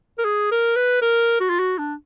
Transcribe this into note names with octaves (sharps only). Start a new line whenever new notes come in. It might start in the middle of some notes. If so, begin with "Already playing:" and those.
A#4
G#4
A#4
B4
A#4
F#4
F4
F#4
D4